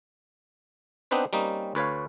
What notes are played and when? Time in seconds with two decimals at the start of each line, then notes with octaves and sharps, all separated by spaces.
1.11 B3 C4 D4 D#4 B4 C5
1.33 G3 A#3 C4 C#4 D#4
1.75 D2 B4 C#5 F5